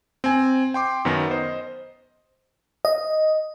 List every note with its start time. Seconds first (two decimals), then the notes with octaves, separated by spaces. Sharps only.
0.24 C4 G#5
0.74 G5 C6 D6
1.05 F#2 D#3 B3 A#4
1.31 C5 D#5
2.85 D#5